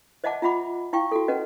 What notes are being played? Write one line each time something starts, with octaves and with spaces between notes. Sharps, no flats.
C5 D#5 E5 F#5 A5 D6
F4 E5 F#5 B5 D6
E4 F5 G5 C#6
F#4 A4
C#4 B4 D#5 F#5